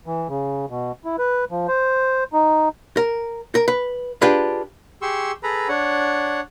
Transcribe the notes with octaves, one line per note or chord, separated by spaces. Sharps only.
E3
C#3
B2
E4
B4
F3
C5
D#4
A#4
A#4
B4
D4 F4 G4 G#4 B4
G4 G#4 C6 C#6 E6
G#4 A4 B4 A#5 B5
D4 C#5 F#5